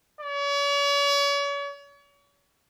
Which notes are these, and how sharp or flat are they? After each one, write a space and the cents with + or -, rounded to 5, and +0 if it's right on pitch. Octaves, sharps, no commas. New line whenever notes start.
C#5 +40